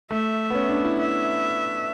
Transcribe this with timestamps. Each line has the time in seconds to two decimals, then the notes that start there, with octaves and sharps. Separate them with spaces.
0.11 A3 E5
0.50 B3
0.55 C#4
0.69 D4
0.85 E4
0.99 E5